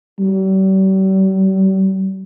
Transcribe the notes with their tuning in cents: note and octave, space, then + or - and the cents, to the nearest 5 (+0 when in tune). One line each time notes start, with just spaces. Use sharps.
G3 -40